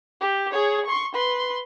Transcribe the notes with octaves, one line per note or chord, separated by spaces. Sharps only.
G4
G#4 C#5
C6 C#6
B4 C6